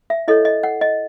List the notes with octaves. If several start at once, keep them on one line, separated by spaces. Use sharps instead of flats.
E5
E4 A4 C#5 D#5
D#5
F#5
D#5